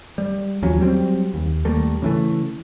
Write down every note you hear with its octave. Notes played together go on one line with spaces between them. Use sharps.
G3
D#2 F3 F#3 C#4
F#3 G3 C4
D#2
D#2 G3 A3 A#3
C#3 E3 A3